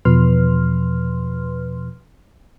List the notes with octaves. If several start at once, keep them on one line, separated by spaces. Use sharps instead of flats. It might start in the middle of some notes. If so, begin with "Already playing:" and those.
E2 B2 F3 B4 C6 F6